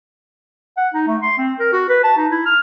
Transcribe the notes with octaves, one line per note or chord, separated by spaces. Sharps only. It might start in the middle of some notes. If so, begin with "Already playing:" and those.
F#5
D#4
A3
C6
C4
A#4
F#4
B4
A5
D#4
E4
F6